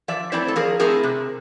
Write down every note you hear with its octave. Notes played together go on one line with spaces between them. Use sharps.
F3 D5 E5
A3 C4 E4 C5 D5
A4
F3 G#4 A#4
A3 C4 E4 G#4 A#4
C3